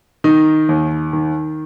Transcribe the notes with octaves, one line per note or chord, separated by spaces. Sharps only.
D#3 D#4
D#2
D#3